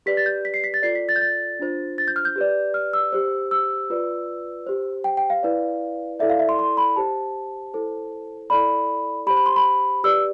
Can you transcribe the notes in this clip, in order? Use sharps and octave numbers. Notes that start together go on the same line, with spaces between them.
G4 B4 D5 B6
A6
G6
B6
C7
B6
A6
F4 A4 D5 C7
B6
A6
G6
A6
D4 F4 C5
A6
G6
F6
G6
G4 B4 D5
F6
E6
G4 C5
E6
F4 B4 D5
G4 C5
G5
G5
F5
E4 B4 D5
E4 A4 D5 E5
F5
E5
C6
C6
B5
G4 C5 A5
E4 A4 C5
E4 A4 D5 B5
G4 C5 B5
B5
C6
B5
G4 B4 D5 E6